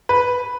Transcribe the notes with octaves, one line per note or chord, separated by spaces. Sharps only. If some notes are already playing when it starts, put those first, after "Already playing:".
B4